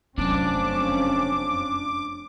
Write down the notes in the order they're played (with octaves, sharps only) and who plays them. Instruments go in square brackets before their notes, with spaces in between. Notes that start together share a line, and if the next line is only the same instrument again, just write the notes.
[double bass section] F1 F3 C#4 [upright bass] F#2 [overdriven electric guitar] D4 [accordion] D6